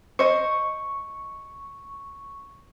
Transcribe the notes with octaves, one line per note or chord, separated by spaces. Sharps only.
C5 D#5 C#6